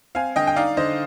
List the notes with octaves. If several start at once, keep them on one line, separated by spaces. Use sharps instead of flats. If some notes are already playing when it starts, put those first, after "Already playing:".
C4 F5 G#5
D3 D#5 G5
G5
D#4 D5 F5
D3 C5 D#5